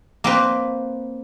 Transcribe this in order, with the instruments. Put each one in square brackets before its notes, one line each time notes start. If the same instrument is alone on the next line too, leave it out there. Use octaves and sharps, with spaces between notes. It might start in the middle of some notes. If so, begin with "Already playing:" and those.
[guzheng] A#3 C4 B4